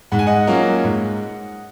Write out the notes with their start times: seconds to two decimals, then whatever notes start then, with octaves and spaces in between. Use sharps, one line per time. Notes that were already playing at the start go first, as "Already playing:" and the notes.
0.12 G#2 F#5
0.19 G#5
0.27 D#5 F#5
0.47 F#3 A#3 C#4 F4
0.84 G#2